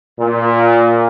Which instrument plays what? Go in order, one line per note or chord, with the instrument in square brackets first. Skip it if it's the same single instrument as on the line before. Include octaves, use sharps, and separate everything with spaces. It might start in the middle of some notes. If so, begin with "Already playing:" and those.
[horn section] A#2